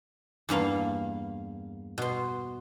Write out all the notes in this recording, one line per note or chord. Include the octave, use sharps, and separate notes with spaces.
E2 G2 A#3 F5
B2 C6